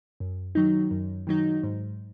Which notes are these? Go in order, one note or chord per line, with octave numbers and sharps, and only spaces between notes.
F#2
D#3 F#3 D#4
F#2
D#3 F#3 D#4
G#2